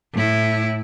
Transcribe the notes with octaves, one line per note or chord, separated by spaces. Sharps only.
A2 E4